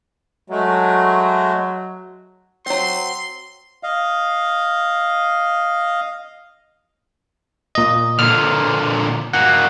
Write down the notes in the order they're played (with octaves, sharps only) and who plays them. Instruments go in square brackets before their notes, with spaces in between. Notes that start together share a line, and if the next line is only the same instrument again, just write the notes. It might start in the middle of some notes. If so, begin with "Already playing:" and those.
[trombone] F#3 [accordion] G#3 A3
[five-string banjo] F#3 C4 [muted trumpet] C6
[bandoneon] D#5 F5
[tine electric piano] A#2 D#5
[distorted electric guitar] A#2 D3 [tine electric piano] F6
[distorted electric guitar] A#3 F#4 [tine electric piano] F#5